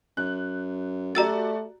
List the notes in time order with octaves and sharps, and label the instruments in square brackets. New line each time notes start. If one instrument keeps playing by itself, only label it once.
[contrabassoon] F#2 [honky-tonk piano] F#6
[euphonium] A3 [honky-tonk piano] F#4 G4 D5 [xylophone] A#5 E6 A6